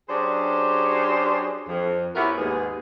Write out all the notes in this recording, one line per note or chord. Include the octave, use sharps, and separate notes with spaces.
F#3 C#4 D4 G4 G#4 C5
F2
B3 C#4 E4 F#4 G4 A#4
D#2 G#2 B3 G#4